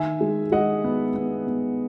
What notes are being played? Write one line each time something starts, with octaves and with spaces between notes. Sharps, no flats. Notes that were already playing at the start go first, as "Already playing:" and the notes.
Already playing: D#3 E5 G#5
G#3
G#3 D#5 F#5
B3
B3
B3